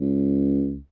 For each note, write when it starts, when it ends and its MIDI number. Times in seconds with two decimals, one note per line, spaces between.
0.01 0.78 37